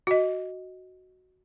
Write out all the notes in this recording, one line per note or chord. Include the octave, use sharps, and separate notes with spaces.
F#4 D#5